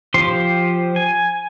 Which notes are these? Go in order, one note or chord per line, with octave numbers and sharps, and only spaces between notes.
F3 G4 C5 C6
G#5